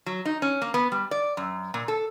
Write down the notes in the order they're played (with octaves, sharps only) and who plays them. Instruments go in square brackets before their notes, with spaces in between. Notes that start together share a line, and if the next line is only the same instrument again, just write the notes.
[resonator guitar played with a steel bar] F#3
D#4
C#4
A#3
B3
G3
D5
F#2
A#2
A4